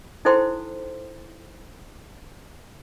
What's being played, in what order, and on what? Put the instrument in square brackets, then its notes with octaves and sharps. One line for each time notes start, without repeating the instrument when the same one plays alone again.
[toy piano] D#4 E4 A4 C5 G5 C6